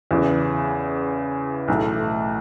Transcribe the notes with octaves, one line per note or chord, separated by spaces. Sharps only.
E2 C#3 E3 B3
B1 A2 E3 A3